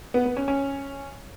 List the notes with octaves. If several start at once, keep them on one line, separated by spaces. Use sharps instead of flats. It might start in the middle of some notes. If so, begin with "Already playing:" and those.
B3
B3
C#4
C#4